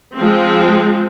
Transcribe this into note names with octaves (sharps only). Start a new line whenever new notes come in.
F3 G#3 C4